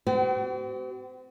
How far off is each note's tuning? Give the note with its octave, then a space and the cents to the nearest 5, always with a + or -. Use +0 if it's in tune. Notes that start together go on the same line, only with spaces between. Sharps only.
C4 -40 F#4 +45